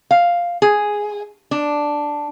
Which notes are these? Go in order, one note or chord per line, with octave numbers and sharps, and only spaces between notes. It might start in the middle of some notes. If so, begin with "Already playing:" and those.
F5
G#4
D4